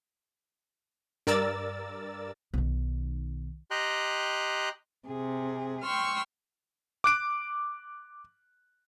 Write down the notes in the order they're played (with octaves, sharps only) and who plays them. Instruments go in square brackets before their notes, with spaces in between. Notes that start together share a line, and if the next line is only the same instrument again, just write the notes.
[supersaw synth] G2 A#4 D5 E6 A6
[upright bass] B1 D#3
[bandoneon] G4 D#5 G5 A#5 C6 F#6
[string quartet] C3 G#4
G5 C6 C#6 E6 F6
[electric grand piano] D6 F#6 D7